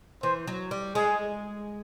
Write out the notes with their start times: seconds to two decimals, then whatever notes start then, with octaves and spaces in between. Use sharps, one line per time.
0.23 E3 C5
0.47 F#3
0.71 G3
0.95 G#3 G#4